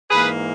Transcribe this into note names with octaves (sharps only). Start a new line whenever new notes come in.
G#2 E3 A#3 G#4 B4